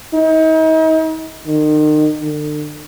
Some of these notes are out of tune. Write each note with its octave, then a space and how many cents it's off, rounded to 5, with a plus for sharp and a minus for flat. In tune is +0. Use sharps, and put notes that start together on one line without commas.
D#4 +40
D#3 -35
D3 +40